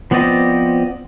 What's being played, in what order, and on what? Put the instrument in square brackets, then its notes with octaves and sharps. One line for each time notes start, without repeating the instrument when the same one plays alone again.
[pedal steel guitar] F3 B3 C4 D5 D#5